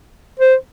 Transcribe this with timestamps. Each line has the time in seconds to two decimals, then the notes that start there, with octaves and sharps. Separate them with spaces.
0.40 C5